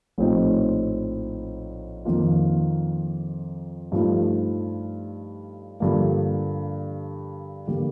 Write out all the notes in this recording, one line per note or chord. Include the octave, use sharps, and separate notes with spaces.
A#1 A2 G3 C4 D#4
F2 D#3 A#3 F4
G2 F3 A3 D#4
G2 D3 F3 A#3
D3 G3 A#3